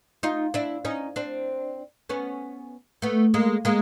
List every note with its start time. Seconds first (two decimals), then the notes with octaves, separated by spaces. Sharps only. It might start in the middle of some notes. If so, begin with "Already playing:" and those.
0.23 D#4 F4
0.54 D4 E4
0.85 C#4 D#4
1.16 C4 D4
2.09 B3 C#4
3.02 A3 B3
3.34 G#3 A#3
3.65 G#3 A#3